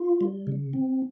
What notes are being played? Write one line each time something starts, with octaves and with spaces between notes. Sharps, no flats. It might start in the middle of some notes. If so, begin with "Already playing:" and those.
Already playing: F4
G3
C#3
C4